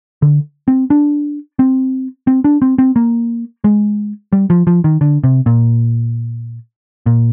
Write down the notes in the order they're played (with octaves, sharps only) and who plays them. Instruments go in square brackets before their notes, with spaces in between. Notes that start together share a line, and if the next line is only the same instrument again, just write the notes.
[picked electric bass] D3
C4
D4
C4
C4
D4
C4
C4
A#3
G#3
G3
F3
F3
D#3
D3
C3
A#2
A#2